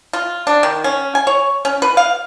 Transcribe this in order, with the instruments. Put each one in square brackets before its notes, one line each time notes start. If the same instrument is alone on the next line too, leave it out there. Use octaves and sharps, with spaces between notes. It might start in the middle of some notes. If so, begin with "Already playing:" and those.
[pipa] F4
D4
D#3
C#4
G#5
C#5
C#4
B4
F5